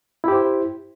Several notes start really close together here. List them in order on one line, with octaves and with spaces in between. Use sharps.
E4 G4 C5